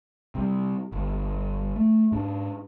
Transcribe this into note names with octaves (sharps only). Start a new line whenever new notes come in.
C3 G3
G1
A3
G#2 D4